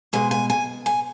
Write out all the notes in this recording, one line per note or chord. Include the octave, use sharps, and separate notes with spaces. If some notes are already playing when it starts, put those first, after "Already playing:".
B2 G#3 G#5
G#5
G#5
G#5